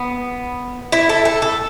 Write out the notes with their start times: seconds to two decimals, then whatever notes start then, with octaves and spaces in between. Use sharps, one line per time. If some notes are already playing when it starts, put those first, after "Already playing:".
Already playing: B3
0.92 E4
1.09 A4
1.25 A4
1.42 A4